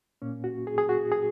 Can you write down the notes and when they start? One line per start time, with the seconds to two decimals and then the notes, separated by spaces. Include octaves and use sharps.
0.22 A#2 A#3 C#4
0.44 F#4
0.67 G#4
0.78 G#4
0.89 F#4
1.12 G#4